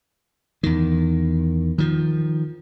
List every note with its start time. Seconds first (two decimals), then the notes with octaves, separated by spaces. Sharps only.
0.63 E2 D#3
1.78 D#3 F3